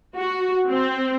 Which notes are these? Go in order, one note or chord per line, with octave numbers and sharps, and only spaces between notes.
F#4
C4